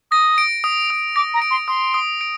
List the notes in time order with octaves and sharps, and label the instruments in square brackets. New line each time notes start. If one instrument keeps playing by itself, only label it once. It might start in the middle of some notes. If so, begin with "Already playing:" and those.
[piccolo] D#6 [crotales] A#6
[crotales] D7
D#6
D#6
[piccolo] D6 [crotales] A#6
[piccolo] A#5
[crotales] D7
[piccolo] C6
[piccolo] C6 [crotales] D#6
[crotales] D#6
D7